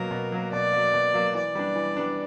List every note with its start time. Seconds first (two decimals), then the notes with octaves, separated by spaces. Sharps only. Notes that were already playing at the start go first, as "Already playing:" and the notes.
Already playing: B2 F#3 A#3 A#4
0.11 B2
0.32 F#3 A#3
0.52 B2 D5
0.72 F#3 A#3
0.94 B2
1.14 F#3 A#3
1.34 E3 D5
1.55 G3 B3 D4
1.75 E3
1.97 G3 B3 D4